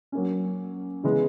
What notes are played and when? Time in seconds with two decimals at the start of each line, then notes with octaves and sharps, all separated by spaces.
0.12 F#3 A#3 C#4
1.04 C#3 E3 G#3 B3